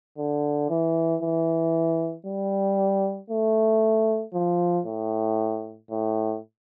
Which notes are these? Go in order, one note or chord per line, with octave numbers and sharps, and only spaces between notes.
D3
E3
E3
G3
A3
F3
A2
A2